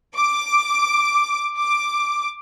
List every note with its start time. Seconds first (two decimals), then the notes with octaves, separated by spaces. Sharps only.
0.15 D6
1.57 D6